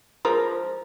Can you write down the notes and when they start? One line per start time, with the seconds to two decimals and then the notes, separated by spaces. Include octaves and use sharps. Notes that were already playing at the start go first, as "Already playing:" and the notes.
0.25 F3 G#3 A#4